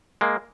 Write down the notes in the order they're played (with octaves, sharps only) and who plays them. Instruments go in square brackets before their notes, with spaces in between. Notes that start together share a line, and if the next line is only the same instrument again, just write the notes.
[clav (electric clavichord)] G#3 A#3